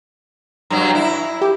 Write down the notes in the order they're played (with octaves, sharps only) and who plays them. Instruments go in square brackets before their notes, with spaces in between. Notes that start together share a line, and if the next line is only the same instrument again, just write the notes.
[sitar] G2 F#3 [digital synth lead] A#5
[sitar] E4
[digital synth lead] G4